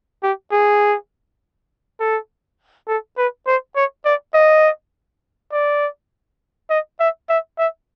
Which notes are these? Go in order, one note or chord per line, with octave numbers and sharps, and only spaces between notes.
G4
G#4
A4
A4
B4
C5
C#5
D5
D#5
D5
D#5
E5
E5
E5